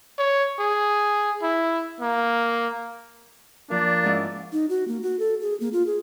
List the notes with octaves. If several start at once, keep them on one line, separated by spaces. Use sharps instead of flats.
C#5
G#4
E4
A#3
F3 A#3 D4 D5
G#2 C#4 E4
D#4
F#4
A#3
F#4
A4
G#4
A#3
F4
G#4